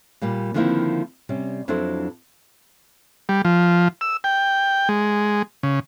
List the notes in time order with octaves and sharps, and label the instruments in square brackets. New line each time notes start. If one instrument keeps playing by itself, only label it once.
[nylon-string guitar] A#2 G3 A#3
D3 D#3 F3 A#3 C4 E4
C3 G3 C#4
F2 F#3 D4 E4 A4 C5
[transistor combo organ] G3
F3
E6
G5
G#3
C#3